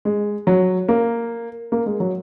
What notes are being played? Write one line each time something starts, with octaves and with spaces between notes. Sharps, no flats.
G#3
F#3
A#3
A#3
G#3
F#3